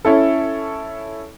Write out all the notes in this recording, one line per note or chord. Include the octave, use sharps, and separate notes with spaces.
C#4 E4 A4